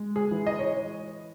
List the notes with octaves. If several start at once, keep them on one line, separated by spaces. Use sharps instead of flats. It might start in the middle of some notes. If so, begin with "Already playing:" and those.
Already playing: G#3
G#4
E3
D#5
C#5